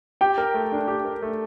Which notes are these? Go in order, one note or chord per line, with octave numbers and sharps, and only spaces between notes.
G4 G5
A#4
A3
D4
G4
A#4
A3